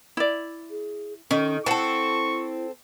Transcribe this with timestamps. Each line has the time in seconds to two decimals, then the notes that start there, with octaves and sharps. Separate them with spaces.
0.17 E4 D5
0.70 G#4
1.31 D#3 C#4 A4
1.66 C4 E4 A4 F#5 A5 C#6